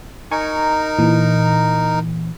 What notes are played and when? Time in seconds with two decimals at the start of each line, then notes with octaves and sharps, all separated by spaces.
0.31 D#4 A#4 G#5 C#6
0.99 A#2 E3